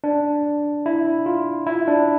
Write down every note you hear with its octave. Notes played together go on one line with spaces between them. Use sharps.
D4
E4
F4
E4
D4